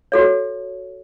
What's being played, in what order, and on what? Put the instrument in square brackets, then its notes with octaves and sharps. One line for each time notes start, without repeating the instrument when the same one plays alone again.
[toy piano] F#4 A4 C#5